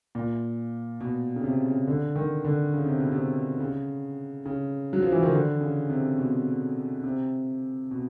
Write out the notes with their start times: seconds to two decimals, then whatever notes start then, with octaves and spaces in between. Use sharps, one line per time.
0.15 A#2
1.00 B2
1.36 C#3
1.44 C3
1.66 C#3
1.87 D3
2.16 D#3
2.44 D3
2.74 C#3
2.86 C3
2.99 B2
3.12 C3
3.60 C#3
4.46 C#3
4.93 F#3
5.02 F3
5.12 E3
5.22 D#3
5.32 D3
5.61 C#3
5.90 C3
6.18 B2
7.04 C3
7.91 B2